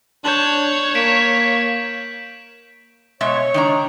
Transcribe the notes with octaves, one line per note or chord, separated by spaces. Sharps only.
D4 C#5 G6 E7 F#7
A#3 B6 D7 E7
B2 G#3 C#5 E5
D#3 D4 A#5